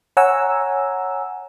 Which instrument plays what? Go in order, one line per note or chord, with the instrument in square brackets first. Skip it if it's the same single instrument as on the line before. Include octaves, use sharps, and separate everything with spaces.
[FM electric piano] C#5 F#5 G#5 A#5 E6